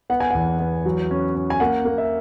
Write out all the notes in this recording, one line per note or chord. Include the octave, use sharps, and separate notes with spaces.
B3 F#5
G#5
E2 F#5
B3
F#3
C#4
C#4
G#5
A#3 F#5
A#3
E5